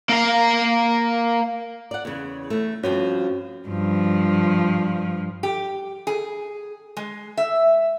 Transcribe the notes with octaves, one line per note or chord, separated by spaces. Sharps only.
A#3 F5
D5 F#5
E2 C#3
E2 A3
G2 F3 C4 C#4 F#4 C#5
G2 F3
G4
G#4
G#3
E5